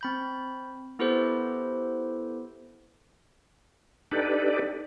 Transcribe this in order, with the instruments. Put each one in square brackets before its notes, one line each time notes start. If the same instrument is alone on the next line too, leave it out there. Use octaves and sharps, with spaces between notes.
[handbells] C4 B5 G6
B3 E4 G4 A4 B4 C5
[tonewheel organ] D4 D#4 G4 A4 B4 D5